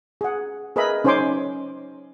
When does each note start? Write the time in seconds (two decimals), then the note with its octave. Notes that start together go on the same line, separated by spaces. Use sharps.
0.21 G#4 F#5
0.76 G#4 A#4 B4 D#5 E5 B5
1.04 C#4 D#4 C5 G#5 C6 D6